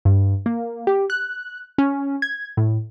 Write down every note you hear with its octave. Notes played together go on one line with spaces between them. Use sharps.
G2
A#3
G4
F#6
C#4
G#6
A2